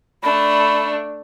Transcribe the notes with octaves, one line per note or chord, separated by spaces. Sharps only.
A3 D4 B5